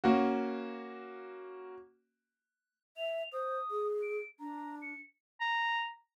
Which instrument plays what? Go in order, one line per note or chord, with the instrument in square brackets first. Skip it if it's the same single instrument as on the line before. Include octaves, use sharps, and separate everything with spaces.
[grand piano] A#3 C#4 F#4
[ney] E5 [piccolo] F7
[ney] C5 [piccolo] D#6
[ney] G#4
[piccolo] D7
[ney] D4 [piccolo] A#5
[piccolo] C#7
[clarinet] A#5